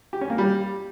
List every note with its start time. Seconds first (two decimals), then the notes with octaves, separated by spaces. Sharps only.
0.13 G4
0.21 C#4
0.30 A#3
0.38 G3